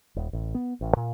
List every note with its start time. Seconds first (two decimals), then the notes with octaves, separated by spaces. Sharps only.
0.16 D#1
0.33 A1
0.55 B3
0.81 A1
0.97 A#2